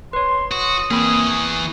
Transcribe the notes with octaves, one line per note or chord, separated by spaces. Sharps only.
B4 C#5 C6
F#4 D#6
E3 A#3 C4 G#4 B5
C#6